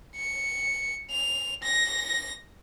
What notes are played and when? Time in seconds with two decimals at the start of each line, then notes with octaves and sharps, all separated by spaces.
0.16 C#7
1.11 F7
1.63 A#6